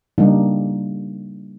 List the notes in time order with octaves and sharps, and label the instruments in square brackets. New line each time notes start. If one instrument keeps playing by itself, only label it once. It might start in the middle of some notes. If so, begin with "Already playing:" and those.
[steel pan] C#3 G3 A#3 D4 D#4